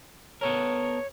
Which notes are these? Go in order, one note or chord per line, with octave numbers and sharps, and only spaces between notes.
B3 A4 A#4 C#5